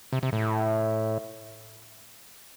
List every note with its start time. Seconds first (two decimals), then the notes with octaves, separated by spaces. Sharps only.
0.13 C3
0.23 C3
0.33 A2